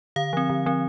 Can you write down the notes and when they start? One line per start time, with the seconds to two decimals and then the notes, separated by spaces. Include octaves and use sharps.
0.16 D3 F5
0.33 F3 C4
0.50 D3
0.66 F3 C4